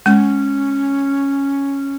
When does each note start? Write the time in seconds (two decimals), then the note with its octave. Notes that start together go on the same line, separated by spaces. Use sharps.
0.06 G#3 C#4